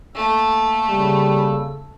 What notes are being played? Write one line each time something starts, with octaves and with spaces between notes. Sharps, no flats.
A3 A#3 A4 E6
C#3 G3